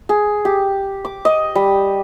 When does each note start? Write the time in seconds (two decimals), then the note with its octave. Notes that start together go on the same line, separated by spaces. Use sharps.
0.09 G#4
0.45 G4
1.05 D6
1.25 D#5
1.55 G3